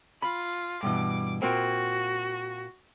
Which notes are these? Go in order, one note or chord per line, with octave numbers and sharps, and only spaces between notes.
F4 B5
G2 B2 E3 D6
A#2 A#3 C4 F#4